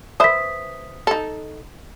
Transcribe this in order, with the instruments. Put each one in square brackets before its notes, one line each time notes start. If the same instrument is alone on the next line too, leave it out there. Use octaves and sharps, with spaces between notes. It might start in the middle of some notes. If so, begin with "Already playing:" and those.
[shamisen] B4 C5 E5 [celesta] D#6 B6
[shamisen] D#4 A4